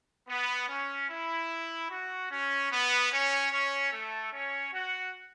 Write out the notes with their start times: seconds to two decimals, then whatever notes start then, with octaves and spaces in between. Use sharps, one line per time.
0.29 B3
0.69 C#4
1.10 E4
1.91 F#4
2.31 C#4
2.72 B3
3.12 C#4 C#5
3.52 C#4 C#5
3.93 A3 A4
4.33 C#4 C#5
4.73 F#4 F#5